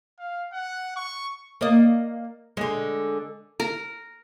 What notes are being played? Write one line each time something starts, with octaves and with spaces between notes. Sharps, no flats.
F5
F#5
C#6
A#3 D5 D#5
D3 G#3
A#4